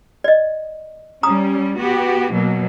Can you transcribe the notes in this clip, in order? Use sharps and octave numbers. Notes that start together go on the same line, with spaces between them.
D5 D#5
G3 C#4 A#5 D#6
B3 F#4 G4
B2 F#3 A#3